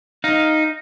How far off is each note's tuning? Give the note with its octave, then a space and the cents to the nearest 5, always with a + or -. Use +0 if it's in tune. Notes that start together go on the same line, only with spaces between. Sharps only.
D#4 +0 F5 +0